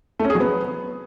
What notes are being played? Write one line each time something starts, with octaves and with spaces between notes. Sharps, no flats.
A3
C#4
G#4
F#3
B3